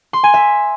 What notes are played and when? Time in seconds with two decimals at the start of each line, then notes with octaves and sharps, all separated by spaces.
0.13 C6
0.24 G#5
0.34 E5